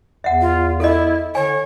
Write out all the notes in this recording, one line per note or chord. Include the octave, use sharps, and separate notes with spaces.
E2 E5 F#5
F4
E4 A4 D#5
D3 C#5 G#5